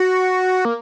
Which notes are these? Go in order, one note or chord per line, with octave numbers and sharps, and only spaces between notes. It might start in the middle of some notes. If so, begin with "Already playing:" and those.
Already playing: F#4
A#3